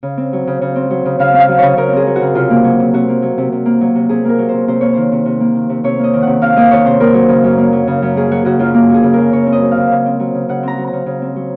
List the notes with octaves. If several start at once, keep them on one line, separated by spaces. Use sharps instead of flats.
C#3
C4
F#3
C#3
C#3
C4
F#3
C#3
C#3 F5
C4
F5
F#3
C#3 C#5
C#3 A#4
C4 G#4
F#3
F#4
C#3
C3 F4
A#3
F#3
C3
C3 F#4
A#3
F#3
C3
C3
A#3
F#3
C3
C3 G#4
A#3 A#4
F#3
C3 C5
C3 C5
A#3 C#5
D#3 C5
C3
C3
A#3
D#3
C3
C3 C#5
A#3 D#5
D#3
C3 F#5
C3 F5
A#3 D#5
D#3 C#5
C3 C5
A#3 A#4
F#3
C#3
F#2
A#3
F#3
C#3
F#2
A#3 G#4
F#3 F#4
C#3 F#4
F#2 F4
A#3
F#3 G#4
C#3
F#2 A#4
C#3 C#5
C4
D#5
F#3
F5
C#3
C#3
C4
F#3
C#3
C#3 F#5
C4 A#5
F#3
A#5
C#3
C#3
C4
F#3